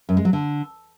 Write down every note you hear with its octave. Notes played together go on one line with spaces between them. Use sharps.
F#2
G#3
F#3
D3